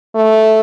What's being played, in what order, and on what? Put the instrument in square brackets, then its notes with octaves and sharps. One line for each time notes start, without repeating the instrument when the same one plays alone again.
[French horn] A3